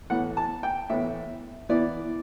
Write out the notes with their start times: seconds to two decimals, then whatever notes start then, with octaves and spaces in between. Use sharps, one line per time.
0.10 A2 E3 B3 F#5
0.37 A5
0.63 G5
0.89 A2 E3 B3 E5
1.69 E3 B3 E4 D5